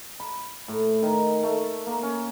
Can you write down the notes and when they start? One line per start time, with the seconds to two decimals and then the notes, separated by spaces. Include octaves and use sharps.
0.20 B5
0.68 A2
1.02 D#3
1.43 A3
1.86 A#3
2.03 C#4